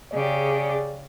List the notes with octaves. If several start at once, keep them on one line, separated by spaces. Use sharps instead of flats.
C#3 G4 G#4 D5